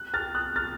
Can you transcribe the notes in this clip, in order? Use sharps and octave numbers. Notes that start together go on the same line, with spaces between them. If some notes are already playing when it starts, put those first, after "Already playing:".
Already playing: F#6
F6 A6
D#6 F#6
F6 A6